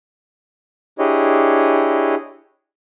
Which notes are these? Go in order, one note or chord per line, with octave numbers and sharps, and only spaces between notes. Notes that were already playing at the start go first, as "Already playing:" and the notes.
D4 E4 G4 G#4 C#5 D#5